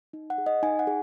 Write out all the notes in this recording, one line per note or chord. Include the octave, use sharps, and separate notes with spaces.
D#4
F#5
G#4
D#5
D#4 G#5
F#5
G#4